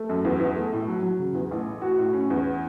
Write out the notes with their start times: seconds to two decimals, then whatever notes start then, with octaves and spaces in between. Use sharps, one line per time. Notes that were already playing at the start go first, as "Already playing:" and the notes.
Already playing: A3
0.09 F#2
0.25 E2
0.40 E2
0.56 A3
0.72 A2
0.88 F#3
1.03 F#3
1.19 C#3
1.35 E2
1.51 A1
1.66 A2
1.82 F#4
1.98 A2
2.13 C#4
2.30 E2